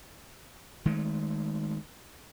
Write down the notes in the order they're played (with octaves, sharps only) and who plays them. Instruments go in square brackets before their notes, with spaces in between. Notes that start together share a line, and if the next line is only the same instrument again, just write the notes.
[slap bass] D#3 G#3 A3